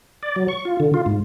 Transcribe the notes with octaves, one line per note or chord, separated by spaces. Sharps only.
D5
F#3
C#6
F4
D3
F4
G#2